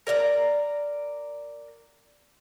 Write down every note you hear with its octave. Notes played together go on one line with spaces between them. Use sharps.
A#4 D5 E5 A#5